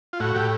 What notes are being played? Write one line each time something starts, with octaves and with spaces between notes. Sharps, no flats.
F4
A2 F#4
A2 G4